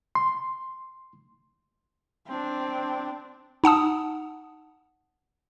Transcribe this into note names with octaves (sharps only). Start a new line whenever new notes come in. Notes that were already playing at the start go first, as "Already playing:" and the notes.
C6
C4 D4
D#4 F#5 A5 D#6